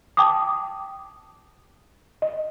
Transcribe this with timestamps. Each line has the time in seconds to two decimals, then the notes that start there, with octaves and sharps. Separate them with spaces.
0.17 G5 A5 D6 D#6
2.22 D#5